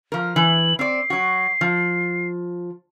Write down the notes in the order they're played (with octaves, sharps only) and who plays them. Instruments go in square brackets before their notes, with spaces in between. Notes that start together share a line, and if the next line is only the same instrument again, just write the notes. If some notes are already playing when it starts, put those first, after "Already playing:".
[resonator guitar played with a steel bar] F3 A#4
[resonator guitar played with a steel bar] E3 [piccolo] F#7
[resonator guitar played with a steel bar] C4 D5 [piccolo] C7
[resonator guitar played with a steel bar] F#3 F#4
F3